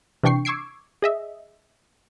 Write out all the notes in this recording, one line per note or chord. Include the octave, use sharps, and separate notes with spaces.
C3 E3 D4 G5 C#6 C7
C#6 D6 E6 G#6 C7 D7
G#4 D#5 E5